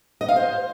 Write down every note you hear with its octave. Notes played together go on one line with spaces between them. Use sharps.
D#5
F5
C5